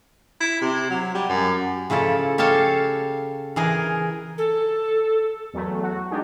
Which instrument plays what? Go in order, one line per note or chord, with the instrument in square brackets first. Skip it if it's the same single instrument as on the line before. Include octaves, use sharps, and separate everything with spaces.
[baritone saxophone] E4
C3
F#3
G3
F#2
[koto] C#3 F3 E4 A4
G4 A4 C#5 F5 A5
E3 G#4 A#4
[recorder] A4
[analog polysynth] E2 F#3 A3
F#4
G#3 D4 D#4 G4 G#4